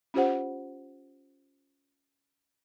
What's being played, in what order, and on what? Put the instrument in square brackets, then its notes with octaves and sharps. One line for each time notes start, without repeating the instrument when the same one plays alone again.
[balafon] C#4 F4 G4 C5 F#5